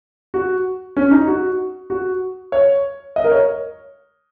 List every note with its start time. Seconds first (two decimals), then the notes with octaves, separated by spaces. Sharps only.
0.34 F#4
0.97 C#4
1.11 D#4
1.28 F#4
1.90 F#4
2.52 C#5
3.16 D#5
3.24 A#4
3.31 C#5